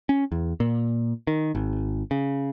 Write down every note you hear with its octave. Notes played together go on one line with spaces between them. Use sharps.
C#4
E2
A#2
D#3
G#1
C#3